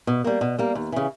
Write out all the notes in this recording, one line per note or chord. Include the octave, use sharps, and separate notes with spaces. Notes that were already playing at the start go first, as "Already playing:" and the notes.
B2
G3 A#3
B2
G3 A#3
D#2
C#3 E3